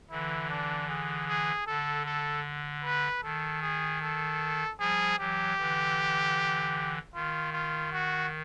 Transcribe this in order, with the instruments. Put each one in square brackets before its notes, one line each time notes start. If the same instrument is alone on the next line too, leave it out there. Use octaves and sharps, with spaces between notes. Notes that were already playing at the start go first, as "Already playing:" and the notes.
[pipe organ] D3 E3 [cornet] E4
[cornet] D4
G#4
G#4
[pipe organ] D3 [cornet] A4
[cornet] A4
B4
[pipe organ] D#3 [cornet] A4
[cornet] G#4
A4
[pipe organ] F3 G3 [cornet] G#4
[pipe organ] E3 F#3 [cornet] G4
[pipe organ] D3 E3
[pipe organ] D#3 [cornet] F4
[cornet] F4
F#4